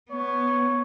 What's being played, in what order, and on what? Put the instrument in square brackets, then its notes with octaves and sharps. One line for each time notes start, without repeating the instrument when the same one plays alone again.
[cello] B3 [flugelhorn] C#5